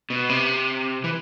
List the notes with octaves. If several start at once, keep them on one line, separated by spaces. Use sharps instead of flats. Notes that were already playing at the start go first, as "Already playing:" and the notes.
B2
C3
E3